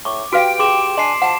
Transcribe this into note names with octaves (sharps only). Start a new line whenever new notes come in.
A2 C#6 D6
F#4 G4 B4 F5 G5 D7
G#4 C6 D6 E7
D4 D#5 G#5 C6 C7
F3 F#5 A5 E7